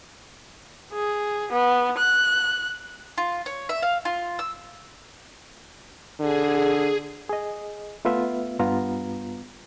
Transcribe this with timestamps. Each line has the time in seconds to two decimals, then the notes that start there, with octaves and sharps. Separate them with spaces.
0.93 G#4
1.52 B3
1.97 F#6
3.18 F4
3.46 C#5
3.69 E5
3.83 F5
4.05 F4
4.39 E6
6.20 D3 G#4
7.29 G#4 D#5
8.05 A3 B3 F4 B4 E5
8.60 G2 B3 F4 A#5